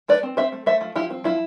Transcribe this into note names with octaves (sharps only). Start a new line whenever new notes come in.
A3 B4 D5
C4
C4 C5 E5
A3
A3 C5 E5
F3
F3 E4 G4
C4
F3 E4